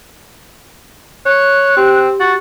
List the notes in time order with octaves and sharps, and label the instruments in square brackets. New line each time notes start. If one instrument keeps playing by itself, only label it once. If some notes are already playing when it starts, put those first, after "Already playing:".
[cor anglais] C#5 [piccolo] F#6
[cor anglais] C4 [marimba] G4
[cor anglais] F#4 [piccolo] A6